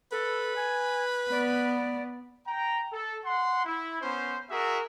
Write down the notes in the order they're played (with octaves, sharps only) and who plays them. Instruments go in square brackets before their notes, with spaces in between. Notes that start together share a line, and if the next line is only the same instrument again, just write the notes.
[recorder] A4 [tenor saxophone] B4
[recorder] G#5
[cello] B3 [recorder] D5
[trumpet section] G5 A#5
A4
F#5 C6
E4
B3 C#4 C5
F#4 G#4 A#4 E5